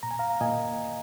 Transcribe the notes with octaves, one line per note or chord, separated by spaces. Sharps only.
A#2 A#5
G#5
F5 A#5
A#2 D#5 G#5